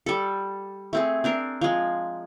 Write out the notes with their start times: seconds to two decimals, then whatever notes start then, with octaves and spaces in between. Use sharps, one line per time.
0.06 G3 A4
0.93 A3 C4 G#4
1.24 C4 D4 A#4
1.61 F3 G#3